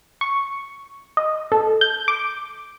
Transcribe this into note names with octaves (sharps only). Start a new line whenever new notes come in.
C#6
D#5
A4
G6
D6